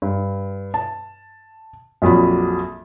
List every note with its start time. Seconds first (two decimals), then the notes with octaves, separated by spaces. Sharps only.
0.02 G2
0.74 A5
2.02 A#1 F2 F#3 B5